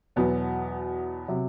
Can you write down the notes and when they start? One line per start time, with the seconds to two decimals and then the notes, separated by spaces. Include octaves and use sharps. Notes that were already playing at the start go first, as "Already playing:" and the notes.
0.16 E2 B2 F#3 B3
1.28 C3 F#3